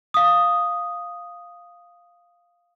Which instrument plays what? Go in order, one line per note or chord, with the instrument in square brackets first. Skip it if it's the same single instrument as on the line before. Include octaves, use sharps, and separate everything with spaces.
[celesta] F5 D#6